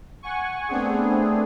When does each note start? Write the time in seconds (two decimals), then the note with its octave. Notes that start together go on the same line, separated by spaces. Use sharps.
0.22 F#5 G#5 C#6
0.68 A3 B3 C4 D4 G#4